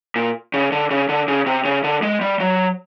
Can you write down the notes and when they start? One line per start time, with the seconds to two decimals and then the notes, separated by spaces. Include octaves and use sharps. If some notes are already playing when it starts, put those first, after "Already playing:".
0.16 A#2
0.54 C#3
0.72 D3
0.91 C#3
1.09 D3
1.28 C#3
1.46 C3
1.65 C#3
1.84 D3
2.02 G#3
2.21 G3
2.40 F#3